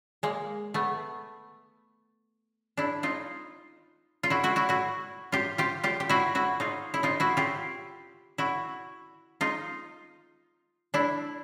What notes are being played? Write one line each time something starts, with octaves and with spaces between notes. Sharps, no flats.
G#3 A#3
A3 B3
D4 E4
D#4 F4
F4
E4 F#4
E4 F#4
E4 F#4
E4 F#4
F4 G4
F4 G4
F4 G4
G4
E4 F#4
E4 F#4
D#4 F4
E4
D#4 F4
E4 F#4
F4 G4
E4 F#4
D#4 F4
D4 E4